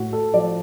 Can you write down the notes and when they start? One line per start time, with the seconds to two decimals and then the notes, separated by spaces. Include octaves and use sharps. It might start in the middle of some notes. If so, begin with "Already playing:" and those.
Already playing: A2 F#4
0.13 A4
0.34 F3 D5